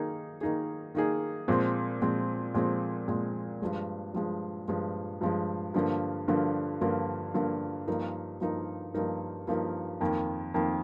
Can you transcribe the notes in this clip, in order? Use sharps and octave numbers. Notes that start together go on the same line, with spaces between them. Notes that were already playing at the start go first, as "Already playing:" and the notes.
Already playing: D#3 A#3 D#4 G#4
D#3 A#3 D#4 G#4
D#3 A#3 D#4 G#4
A#2 F3 G#3 C4
A#2 F3 G#3 C4
A#2 F3 G#3 C4
A#2 F3 G#3 C4
G2 F3 G#3
G2 F3 G#3
G2 F3 G#3
G2 F3 G#3
G2 D3 F3 A#3
G2 D3 F3 A#3
G2 D3 F3 A#3
G2 D3 F3 A#3
G2 F3 A#3 D#4 A#4
G2 F3 A#3 D#4 A#4
G2 F3 A#3 D#4 A#4
G2 F3 A#3 D#4 A#4
F2 D#3 A#3
F2 D#3 A#3